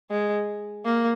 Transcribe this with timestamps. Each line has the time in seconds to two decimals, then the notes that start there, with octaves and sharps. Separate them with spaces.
0.10 G#3
0.85 A#3